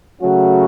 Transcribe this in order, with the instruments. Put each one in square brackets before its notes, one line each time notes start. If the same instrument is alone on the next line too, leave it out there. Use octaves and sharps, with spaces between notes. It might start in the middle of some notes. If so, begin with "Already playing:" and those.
[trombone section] C#3 F#3 A3 C#4 F#4